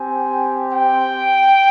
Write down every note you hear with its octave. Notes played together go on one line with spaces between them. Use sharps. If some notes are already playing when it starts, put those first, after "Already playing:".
Already playing: C4 G4 G#5
G5